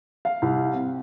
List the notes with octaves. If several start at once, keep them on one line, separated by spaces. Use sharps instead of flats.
F5
C2
C4